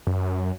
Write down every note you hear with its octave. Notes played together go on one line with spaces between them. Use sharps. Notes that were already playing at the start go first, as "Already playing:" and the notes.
F#2